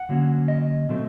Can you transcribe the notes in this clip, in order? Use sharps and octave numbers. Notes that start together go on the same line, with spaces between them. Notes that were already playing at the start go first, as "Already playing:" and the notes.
Already playing: F#5
D3 F#3 A#3 C#4
D#5
B2 F#3 A3 C4